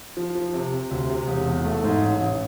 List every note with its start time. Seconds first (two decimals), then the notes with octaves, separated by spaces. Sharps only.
0.17 F3
0.35 F3
0.53 C3
0.73 C3
0.91 D2
1.10 C3
1.27 E1
1.46 E2
1.65 A3
1.84 G#2
2.01 A1
2.21 A1